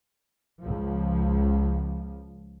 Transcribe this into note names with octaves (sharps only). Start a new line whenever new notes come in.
C#2 F3